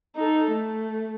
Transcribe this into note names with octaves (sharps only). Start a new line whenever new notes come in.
D#4 A4
A3